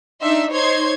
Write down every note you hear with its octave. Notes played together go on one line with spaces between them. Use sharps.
D4 D#4 E5 C6
D#4 C5 C#5 C6 G#6